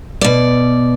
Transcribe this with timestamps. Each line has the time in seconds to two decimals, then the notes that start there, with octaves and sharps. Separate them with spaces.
0.21 B2 D5